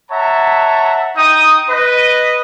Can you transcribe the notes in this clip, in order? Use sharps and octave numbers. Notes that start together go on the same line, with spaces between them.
C#5 E5 F#5 A5 A#5
D#4 G5 D#6
B4 D#5